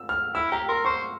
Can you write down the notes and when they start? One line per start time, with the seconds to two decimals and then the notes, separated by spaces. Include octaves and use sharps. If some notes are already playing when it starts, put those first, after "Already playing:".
Already playing: E6
0.09 F6
0.35 E4 E6
0.52 G4 A#5
0.68 A#4 C6
0.85 C5 C#6